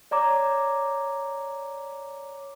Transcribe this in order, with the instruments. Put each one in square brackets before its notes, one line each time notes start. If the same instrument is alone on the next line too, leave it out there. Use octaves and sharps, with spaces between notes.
[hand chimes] C#5 D5 A#5 D6